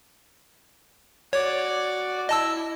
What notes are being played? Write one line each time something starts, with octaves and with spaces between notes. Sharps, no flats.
F#4 C#5 D5
E4 D#5 A5 E6